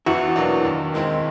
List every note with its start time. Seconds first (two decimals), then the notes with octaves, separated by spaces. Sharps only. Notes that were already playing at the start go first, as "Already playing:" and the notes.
0.06 E2 E4 F#4
0.36 B2 F#3 A#3 D4
0.65 D#2
0.94 D#3 G#3 C4 E4